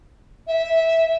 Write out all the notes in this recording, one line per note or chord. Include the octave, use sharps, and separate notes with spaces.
E5